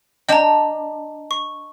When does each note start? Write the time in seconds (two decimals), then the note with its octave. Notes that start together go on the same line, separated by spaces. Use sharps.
0.29 D4 D#5 G5 A5 A#5
1.31 C#6